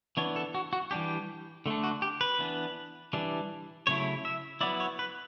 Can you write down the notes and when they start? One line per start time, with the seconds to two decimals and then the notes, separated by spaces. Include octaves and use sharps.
0.17 E3 B3 D4 C#5
0.36 A4
0.55 F#4
0.73 F#4
0.91 E3 G3 D4 G4
1.66 D3 A3 D4
1.83 F#4
2.02 G4
2.21 B4
2.39 E3 B3 D4
3.13 E3 G3 D4
3.87 C#3 F#3 A3 E4 C#5
4.25 E5
4.61 F#3 B3 E4 D5
4.80 C#5
4.99 B4